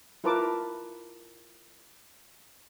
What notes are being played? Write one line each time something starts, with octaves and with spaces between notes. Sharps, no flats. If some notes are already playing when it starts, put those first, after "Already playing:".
E4 F4 A#4 B4 A5 D6